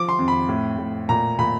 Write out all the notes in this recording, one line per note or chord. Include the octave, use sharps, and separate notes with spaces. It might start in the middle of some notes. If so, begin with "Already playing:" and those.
Already playing: F3 D6
C6
F2
B5
A2
A2
A#2 A#5
A#2 B5